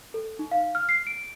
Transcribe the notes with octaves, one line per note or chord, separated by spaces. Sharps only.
A4
D#4
F5
F6
C7
D7